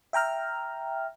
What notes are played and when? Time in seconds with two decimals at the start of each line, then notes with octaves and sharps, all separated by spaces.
0.13 E5 G5 A#5 F6